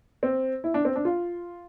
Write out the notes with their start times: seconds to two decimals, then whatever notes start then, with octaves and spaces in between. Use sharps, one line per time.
0.23 C4
0.64 E4
0.74 D4
0.85 C4
0.96 D4
1.05 F4